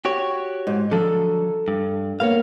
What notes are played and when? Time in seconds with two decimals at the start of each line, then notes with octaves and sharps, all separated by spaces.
0.05 F#4 G4 C#5
0.67 G#2
0.91 D3 F3 F#3 A4
1.68 G2
2.20 A#3 B3 C#5 F5